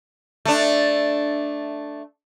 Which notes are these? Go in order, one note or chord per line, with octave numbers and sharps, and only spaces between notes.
A3 D4